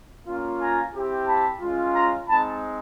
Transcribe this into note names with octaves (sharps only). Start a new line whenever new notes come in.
A#3 C#4 F4
G#5 A#5
C4 E4 G4
A5 B5
G#3 C#4 F4
A#5 C6
G#3 C4 D#4 A5 B5